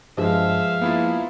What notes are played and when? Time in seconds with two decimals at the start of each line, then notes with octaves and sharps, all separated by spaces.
0.17 G2 F3 G#3 E5 F5
0.82 A#3 B3 E4 F4